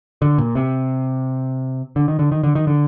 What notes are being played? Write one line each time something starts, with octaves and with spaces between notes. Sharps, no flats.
D3
A#2
C3
D3
D#3
D3
D#3
D3
D#3
D3